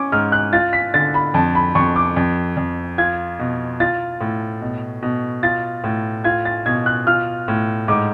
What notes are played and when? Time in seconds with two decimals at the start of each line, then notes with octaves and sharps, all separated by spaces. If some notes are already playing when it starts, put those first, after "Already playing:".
Already playing: C#4 D6
0.12 G#2 F6
0.32 F#6
0.53 F4 A6
0.73 B6
0.94 D3 A6
1.14 B5
1.34 F2 A5
1.55 B5
1.75 F2 C#6
1.96 D6
2.16 F2
2.57 F2
2.98 F4 G#6
3.39 B2
3.80 F4 A6
4.21 A2
4.61 B2
5.02 B2
5.43 F4 A6
5.84 A2
6.24 F4 G#6
6.45 A6
6.66 B2 G#6
6.86 F#6
7.07 F4 F6
7.48 A2
7.88 G#2 D6